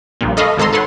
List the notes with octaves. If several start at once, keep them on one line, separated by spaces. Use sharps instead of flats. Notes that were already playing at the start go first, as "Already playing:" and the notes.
A#1 G2 A#2
A4 D#5 F5 B5 C#6
G#1 G#2 A4 A#5 C6
A4 B4 C#5 F#5 C6